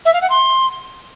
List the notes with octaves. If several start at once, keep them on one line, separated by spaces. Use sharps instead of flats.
E5
F5
F#5
C6